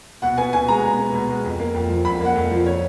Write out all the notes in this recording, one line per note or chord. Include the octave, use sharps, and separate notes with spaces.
B2 F#5
B3 G#5
B2 G#5
G#3 A#5
B2
B3
B2
G#3
F2
A#3
F2
F3
F2 B5
A#3 F#5
F2
F3
C#5